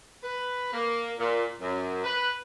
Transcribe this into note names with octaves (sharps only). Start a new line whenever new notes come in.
B4
A#3
A#2
F#2
B4